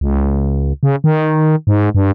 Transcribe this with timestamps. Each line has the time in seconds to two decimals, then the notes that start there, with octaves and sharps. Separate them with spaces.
0.01 C#2
0.83 C#3
1.04 D#3
1.67 G#2
1.95 G2